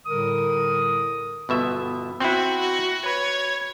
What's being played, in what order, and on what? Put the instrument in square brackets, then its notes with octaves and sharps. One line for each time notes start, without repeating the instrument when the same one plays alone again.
[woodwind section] A2 D3 G3 A#4 D#6
[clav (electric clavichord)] G1 B2 E5
[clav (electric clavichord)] C4 E4 [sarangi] F#4
[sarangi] F#4
[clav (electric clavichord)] B4 [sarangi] C#5